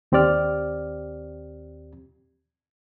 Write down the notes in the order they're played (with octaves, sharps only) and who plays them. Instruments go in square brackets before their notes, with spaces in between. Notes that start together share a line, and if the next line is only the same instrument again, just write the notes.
[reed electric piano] D#2 C4 G4 D5 F6